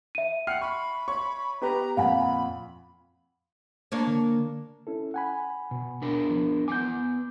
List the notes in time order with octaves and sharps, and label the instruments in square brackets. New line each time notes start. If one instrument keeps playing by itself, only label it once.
[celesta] E5 D#7
[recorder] F#5 [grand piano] G5 F6 C7
[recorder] B5 [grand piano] C#6
[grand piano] C#5 C#6
[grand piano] B3 G4 B4 [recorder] A#5
[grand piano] F2 A#2 [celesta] F5 F#5 G#5 [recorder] B5
[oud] A#3 D4 C#5
[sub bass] D3
[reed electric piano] C#4 E4 A4
F#5 G#5 B5
[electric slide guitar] B2
B3 D4 A#4
[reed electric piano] F3
[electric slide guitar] B3 B4 G#5 [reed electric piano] D6 G6